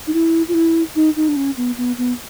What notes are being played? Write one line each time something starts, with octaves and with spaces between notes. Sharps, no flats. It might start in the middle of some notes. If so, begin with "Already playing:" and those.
D#4
E4
F4
E4
D#4
D#4
D4
C#4
B3
B3
B3